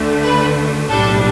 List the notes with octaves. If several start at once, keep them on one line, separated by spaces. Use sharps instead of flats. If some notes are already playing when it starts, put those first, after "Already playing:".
Already playing: D2 D3 A3
B4
B1 A2 G3 D4 A4